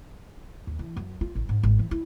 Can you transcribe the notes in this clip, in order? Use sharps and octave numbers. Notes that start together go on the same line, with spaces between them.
D#2
E3
F#2
F4
A1
G#2
G#1
E3
E4